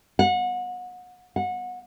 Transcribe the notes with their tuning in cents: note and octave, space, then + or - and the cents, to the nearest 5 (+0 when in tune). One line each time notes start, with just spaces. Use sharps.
F#5 -30
F#5 -25